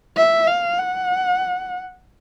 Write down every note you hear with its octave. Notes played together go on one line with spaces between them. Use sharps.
E5
F5
F#5